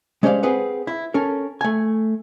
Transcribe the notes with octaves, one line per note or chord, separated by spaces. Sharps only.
G#3 C#4 G4 C5 D5 F5
C4 G#4 B4 F#5
E4
C#4 A4 A#4
A3 G#5